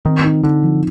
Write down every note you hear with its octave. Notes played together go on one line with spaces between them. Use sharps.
D#3 C4
D#4
D3 D#4
F3